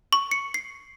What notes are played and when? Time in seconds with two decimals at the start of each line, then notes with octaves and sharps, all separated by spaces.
0.13 C#6
0.31 C#7
0.54 C7